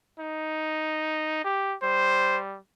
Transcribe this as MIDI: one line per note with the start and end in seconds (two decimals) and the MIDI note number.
0.20 1.39 63
1.44 1.75 67
1.84 2.57 55
1.84 2.40 72